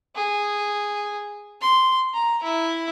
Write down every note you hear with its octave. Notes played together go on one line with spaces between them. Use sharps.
G#4
C6
A#5
E4